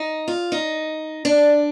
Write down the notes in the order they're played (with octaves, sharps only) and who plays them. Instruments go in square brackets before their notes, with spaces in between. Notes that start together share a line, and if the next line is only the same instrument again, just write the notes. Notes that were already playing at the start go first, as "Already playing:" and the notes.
Already playing: [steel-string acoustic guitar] D#4
F4
D#4
D4